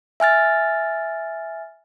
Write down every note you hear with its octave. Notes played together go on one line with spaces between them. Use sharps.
E5 G#5 F6 A6